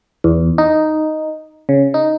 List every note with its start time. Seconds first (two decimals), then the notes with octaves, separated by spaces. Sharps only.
0.24 E2
0.58 D#4
1.69 C#3
1.94 D#4